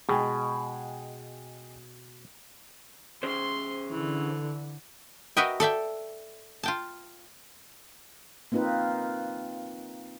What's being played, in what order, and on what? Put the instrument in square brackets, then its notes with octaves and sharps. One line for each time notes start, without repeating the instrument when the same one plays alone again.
[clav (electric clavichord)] B2 [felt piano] G#3 G5 G#5
[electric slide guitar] C#4 G#4 C5 [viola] C6
[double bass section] D3 [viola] E3
[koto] F#4 A#4 B4 D#5 E5 G5
A4 D5 E5 G5
F4 G5 A5
[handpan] A#3 C4 D#4 F4 B4